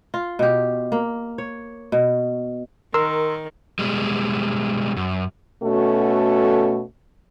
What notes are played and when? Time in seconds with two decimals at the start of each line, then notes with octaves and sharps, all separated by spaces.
0.14 F4
0.39 B2 G4
0.92 A#3
1.38 C#5
1.92 B2
2.94 D#3 A#4 C6 E6
3.79 B2 G3 G#3
4.97 F#2
5.63 B2 A3 C#4 F#4 A4